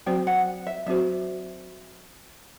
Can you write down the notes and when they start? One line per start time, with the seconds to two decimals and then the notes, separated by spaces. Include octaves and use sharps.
0.06 F#3 C4 F#4 C5 G5
0.27 F#5
0.67 E5
0.86 F#3 C4 F#4 C5 E5